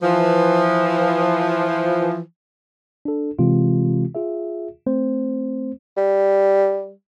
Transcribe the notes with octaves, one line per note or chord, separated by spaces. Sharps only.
E3 F3
D4 A4
C3 E3 G#3 C4 F4 G4
F4 G#4 E5
A3 C4 C5
G3